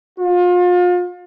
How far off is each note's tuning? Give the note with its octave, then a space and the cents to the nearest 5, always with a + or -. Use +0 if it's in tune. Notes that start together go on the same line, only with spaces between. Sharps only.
F4 +35